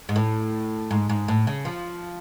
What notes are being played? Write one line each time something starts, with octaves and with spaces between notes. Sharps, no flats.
G#2
A2
G#2
G#2
A2
C#3
F3